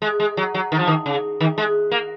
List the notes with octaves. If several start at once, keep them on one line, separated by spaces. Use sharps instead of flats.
G#3
G#3
F#3
F#3
D#3
F3
D#3
C#3
D#3
G#3
A#3